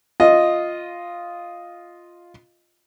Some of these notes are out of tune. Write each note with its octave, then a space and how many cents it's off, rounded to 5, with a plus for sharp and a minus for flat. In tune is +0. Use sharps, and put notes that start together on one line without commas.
F4 +0 D#5 +0